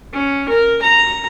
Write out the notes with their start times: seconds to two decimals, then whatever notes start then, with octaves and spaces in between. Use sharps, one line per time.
0.13 C#4
0.49 A#4
0.82 A#5